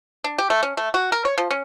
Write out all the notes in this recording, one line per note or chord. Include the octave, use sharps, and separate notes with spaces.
D4
G4
A3
C#4
A3
F#4
A#4
C#5
F3
C#4